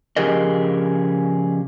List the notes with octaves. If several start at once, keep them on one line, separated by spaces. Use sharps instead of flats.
C#3 F3 G4 G#4 A#4 D#5